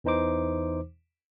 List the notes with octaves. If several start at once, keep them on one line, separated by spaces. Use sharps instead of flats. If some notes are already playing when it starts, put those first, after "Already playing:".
E2 E3 D#4 C5 D6